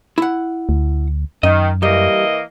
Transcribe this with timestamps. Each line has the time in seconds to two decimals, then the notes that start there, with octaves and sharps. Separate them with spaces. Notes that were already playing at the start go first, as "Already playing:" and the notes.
0.18 E4 F#5
0.69 D2
1.43 F#2 D#3 D#5
1.83 E3 G3 A#3 D#5